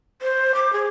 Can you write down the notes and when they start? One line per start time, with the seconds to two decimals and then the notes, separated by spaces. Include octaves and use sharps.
0.22 C5
0.55 D6
0.73 G#4